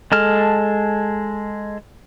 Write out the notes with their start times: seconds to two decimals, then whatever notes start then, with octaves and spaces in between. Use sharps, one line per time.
0.12 G#3 A4 A5 F6